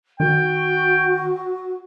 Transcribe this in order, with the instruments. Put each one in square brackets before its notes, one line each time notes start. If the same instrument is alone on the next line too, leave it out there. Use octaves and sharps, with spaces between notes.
[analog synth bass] D#3 [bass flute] F#4 [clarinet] G5